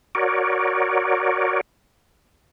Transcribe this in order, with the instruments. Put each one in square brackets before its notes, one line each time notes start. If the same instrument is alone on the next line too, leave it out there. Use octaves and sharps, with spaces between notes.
[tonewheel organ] F#4 A#4 C#5 D5